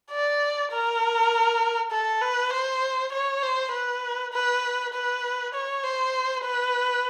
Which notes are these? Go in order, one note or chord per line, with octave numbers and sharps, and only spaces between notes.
D5
A#4
A4
B4
C5
C#5
C5
B4
B4
B4
C#5
C5
B4